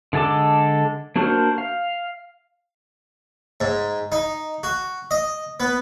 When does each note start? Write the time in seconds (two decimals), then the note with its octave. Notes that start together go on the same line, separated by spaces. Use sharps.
0.13 D3 G#3 A4 A5 D6
1.16 A#3 D4 F#4 A#4 C5
1.58 F5
3.61 G#2
4.12 D#4
4.63 F#4
5.11 D#5
5.60 B3